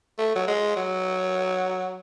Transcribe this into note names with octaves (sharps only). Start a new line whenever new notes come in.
A3
F#3
G#3
F#3